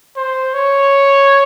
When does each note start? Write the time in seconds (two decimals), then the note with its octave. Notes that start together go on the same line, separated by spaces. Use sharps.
0.17 C5
0.54 C#5